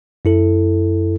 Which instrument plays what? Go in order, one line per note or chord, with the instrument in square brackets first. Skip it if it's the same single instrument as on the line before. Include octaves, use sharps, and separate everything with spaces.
[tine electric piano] F#2 E4 A4